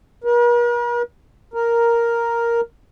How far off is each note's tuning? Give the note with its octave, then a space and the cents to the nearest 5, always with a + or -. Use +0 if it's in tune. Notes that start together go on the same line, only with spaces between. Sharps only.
A#4 +45
A#4 +0